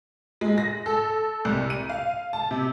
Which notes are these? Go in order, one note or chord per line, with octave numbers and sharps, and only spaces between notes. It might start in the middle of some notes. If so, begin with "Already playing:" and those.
G#3
A#6
A4
C2
D#7
F5
A5
C3